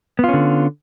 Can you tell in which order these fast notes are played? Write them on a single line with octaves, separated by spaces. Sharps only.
B3 F4 C#4 D3